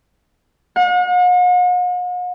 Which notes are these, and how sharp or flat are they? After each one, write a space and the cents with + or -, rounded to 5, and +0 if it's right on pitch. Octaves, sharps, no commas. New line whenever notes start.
F#5 -45